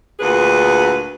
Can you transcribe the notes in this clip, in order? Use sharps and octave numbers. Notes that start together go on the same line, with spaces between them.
D2 A#2 G#4 B4